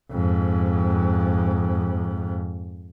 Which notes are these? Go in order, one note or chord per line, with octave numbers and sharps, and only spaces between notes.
F2 G#2